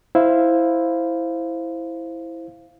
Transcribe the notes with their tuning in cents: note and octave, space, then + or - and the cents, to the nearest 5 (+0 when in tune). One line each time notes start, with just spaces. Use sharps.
E4 +0 C5 +0 F5 -5